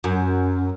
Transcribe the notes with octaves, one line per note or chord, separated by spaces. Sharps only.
F#2